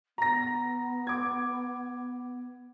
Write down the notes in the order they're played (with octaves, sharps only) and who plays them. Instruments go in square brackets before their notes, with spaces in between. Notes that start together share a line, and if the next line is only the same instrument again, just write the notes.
[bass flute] B3 [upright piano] A#5 A#6
[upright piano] D6 G#6